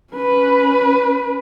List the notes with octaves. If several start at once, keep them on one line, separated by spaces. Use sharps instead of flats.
C#4 B4